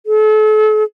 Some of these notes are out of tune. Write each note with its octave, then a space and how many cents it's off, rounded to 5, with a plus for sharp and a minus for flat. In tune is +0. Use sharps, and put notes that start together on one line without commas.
A4 -40